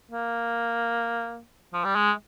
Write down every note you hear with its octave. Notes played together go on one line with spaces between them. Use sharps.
A#3
F3
G3
G#3